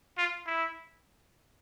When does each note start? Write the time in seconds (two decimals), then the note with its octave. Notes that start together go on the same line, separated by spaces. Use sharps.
0.18 F4
0.46 E4